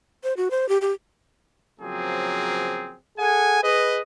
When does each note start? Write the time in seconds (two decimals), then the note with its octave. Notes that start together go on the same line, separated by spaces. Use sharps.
0.24 C5
0.37 F#4
0.51 C5
0.69 G4
0.81 G4
1.80 C#3 F3 F#3 A#3 C4 G#4
3.18 G#4 A4 F#5 G#5
3.62 G#4 B4 D#5